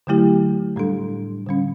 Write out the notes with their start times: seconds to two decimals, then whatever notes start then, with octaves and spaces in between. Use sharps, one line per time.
0.07 D3 F#3 A3 E4 G4
0.76 A2 G3 D4 A4
1.46 D3 G3 C#4